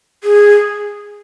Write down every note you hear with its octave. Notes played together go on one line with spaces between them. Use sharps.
G#4